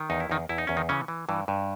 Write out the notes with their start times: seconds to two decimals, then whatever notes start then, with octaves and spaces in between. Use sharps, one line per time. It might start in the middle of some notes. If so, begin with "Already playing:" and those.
Already playing: D#3
0.10 E2 D#4
0.20 E4
0.30 E2 D#3 D#4
0.49 E2 E4
0.58 D#4
0.67 E2 C#4
0.77 D#3 D#4
0.89 C#3 E3 C#4
1.08 E3
1.29 G2 E3
1.48 G2